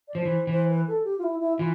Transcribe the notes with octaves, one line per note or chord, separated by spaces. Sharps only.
D5
F3 C5
E3
E3 C5
B4
A4
G4
F4
E4
E4
E3 F4